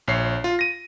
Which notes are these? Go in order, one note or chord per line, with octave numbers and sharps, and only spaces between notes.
A#1 C#5 C7
F4
A#6 D#7